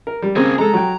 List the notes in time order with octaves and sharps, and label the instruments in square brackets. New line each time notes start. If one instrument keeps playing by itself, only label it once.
[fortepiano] A#4
G3
[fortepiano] C#3 A#3 C4 [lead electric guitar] G#4 A#4
[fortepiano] G#3 A4 [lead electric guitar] A#5
[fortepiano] F#3 G5